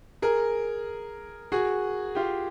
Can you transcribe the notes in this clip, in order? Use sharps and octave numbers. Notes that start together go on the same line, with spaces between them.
G#4 A#4
F#4 G#4
F4 G4